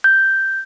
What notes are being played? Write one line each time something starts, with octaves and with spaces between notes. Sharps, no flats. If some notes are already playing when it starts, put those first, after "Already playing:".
G6